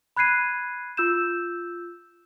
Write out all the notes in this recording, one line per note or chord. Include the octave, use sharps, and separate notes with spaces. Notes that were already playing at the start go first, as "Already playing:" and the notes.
B5 F#6 G#6 C7 D#7
F4 E6 G6 E7